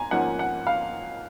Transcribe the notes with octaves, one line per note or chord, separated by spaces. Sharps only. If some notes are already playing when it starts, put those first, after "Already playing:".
Already playing: G#2 G#5 A#5
G#2 F3 A#3 C#4 F#5
F#5
F5